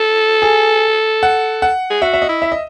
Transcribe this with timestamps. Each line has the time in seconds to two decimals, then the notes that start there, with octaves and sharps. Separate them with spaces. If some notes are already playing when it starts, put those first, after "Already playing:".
Already playing: A4
0.42 G#4
1.23 F#5
1.62 F#5
1.90 G#4
2.02 F#4 E5
2.14 E5
2.22 D#5
2.29 E4
2.42 E5
2.52 D#5